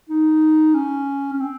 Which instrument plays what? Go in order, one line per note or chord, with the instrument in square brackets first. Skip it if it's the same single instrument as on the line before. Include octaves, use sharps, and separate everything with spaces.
[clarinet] D#4
C#4
C#4
C4